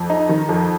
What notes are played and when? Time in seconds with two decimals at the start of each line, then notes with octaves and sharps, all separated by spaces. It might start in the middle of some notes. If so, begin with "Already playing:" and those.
Already playing: F2
0.10 D#4
0.29 D#3
0.49 F2